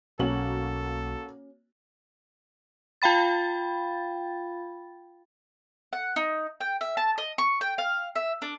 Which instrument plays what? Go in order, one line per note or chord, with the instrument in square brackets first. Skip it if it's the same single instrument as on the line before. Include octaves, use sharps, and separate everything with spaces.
[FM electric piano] B1 [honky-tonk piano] A#3 F#4 F#7 [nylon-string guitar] C#4 [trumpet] A4
[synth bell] F4 F5 G5 B5 A6
[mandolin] F#5
D#4
G5
E5
A5
D#5
C#6
G5
F5
E5
D4